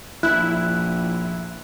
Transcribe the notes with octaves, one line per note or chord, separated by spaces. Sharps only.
A#1 E4 F#6